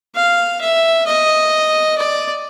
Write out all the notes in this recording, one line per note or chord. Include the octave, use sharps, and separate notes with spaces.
F5
E5
D#5
D5